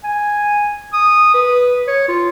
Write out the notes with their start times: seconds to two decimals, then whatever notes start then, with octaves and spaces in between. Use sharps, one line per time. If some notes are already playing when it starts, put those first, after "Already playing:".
0.04 G#5
0.93 D#6
1.34 B4
1.88 C#5
2.08 F4